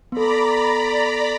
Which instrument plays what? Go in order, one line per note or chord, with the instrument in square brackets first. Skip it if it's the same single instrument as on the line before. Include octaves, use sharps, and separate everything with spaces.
[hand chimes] B3 A4 [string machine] D5 A#5 B5